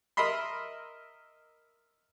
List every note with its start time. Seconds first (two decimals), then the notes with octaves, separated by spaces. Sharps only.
0.17 A#4 D#5 E5 B5 C6